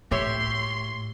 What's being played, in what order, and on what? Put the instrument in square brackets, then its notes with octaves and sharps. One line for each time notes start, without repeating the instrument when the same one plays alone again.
[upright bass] A2 [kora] G4 C#5 E5 [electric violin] C6 C7